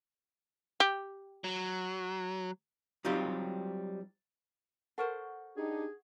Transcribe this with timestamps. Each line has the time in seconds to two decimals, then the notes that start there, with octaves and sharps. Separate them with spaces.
0.80 G4
1.44 F#3
3.05 F#3 G3 C4 D#4 F4 G4
4.98 A4 A#4 C5 F#5 C#6
5.57 D4 D#4 G4 G#4